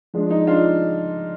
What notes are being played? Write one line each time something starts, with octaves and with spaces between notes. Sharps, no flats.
F3 G#3 D4
D#4
D4 F4